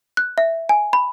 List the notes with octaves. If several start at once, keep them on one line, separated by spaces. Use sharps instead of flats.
F#6
E5
G#5
B5